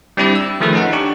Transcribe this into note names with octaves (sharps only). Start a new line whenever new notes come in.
G3 C4 D4 E4 G4 D5
E6
D#3 F3 A3 G#4 A4 B4
C#4 D#4 F#5
D4 G4 C#6